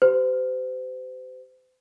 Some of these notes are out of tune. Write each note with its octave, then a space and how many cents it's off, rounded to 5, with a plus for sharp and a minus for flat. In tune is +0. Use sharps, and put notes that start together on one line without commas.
G4 -20 C5 -35